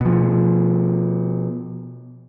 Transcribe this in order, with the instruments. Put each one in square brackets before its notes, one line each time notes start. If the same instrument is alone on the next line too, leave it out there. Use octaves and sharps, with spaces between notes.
[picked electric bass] B2 F3